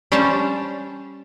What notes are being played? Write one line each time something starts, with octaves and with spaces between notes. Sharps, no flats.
G3 C#4 D4 C5 C#5 A5